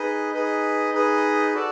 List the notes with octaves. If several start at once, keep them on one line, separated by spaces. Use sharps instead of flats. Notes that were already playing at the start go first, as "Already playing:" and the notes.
Already playing: D#4 G#4 B4 D#5
D#4 G#4 B4 D#5
D#4 G#4 B4 D#5
F#4 A4 D5